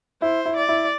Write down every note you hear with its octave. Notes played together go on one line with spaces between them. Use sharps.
E4 C5
E4
D5
E4